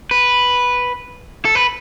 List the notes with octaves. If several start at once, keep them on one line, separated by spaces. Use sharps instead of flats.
B4
A4
B4